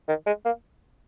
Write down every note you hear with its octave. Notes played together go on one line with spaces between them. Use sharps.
D#3
G#3
A#3